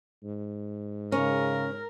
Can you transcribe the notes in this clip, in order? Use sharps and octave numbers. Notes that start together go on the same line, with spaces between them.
G#2
C#3 C#4 A#4